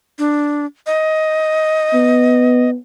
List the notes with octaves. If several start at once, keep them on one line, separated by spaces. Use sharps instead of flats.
D4
D#5
B3